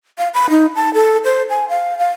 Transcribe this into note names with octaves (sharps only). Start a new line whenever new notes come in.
F5
B5
D#4
A5
A4
C5
G#5
F5
F5